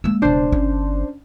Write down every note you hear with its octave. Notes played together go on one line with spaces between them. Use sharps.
G#3 A#3 E6
E1 C#3 D4 C5
G1 C#4